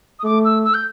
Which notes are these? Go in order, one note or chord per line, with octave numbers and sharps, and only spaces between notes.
D#6
A3 D6
E6
E6
G6